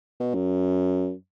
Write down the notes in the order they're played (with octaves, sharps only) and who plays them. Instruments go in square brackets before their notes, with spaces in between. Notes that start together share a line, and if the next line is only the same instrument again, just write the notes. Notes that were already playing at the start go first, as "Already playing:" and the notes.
[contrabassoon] B2
F#2